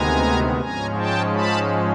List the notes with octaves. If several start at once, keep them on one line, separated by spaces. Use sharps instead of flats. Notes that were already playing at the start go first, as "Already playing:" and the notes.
Already playing: D2 C3 D#3 G#3 B3 G#5 A#5
G#2 F3 G#3 C#4 G#5 A#5
G5 A5
A5 B5